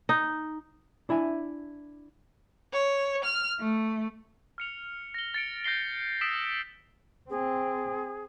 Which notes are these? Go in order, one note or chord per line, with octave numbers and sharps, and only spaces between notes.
D#4
D4 E4 E5 G#5
C#5
F6
A3
F6 C#7 F7
A#6 G7
A6 C#7 D7
G6 A#6 C7 G7
D#6 E6 B6 D7 E7
C4 G#4